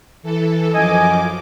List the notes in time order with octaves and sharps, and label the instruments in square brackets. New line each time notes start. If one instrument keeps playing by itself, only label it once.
[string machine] E3 A4
[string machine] F#2 F3 D6 [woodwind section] D#5 G#5